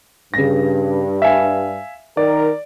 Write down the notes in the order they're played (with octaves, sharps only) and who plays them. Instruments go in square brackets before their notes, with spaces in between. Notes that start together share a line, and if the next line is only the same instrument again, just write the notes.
[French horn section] G2 [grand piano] C#3 A#6
[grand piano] E5 F5 G#5
[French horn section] D#3 A#4 [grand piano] D5